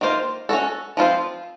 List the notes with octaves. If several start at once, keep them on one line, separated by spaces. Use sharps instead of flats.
D#3 A#3 F4 C5
C#4 F#4 A4
F3 C4 F4 C5